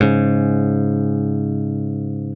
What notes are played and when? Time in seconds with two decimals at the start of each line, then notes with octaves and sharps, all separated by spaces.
0.01 G#2 C#3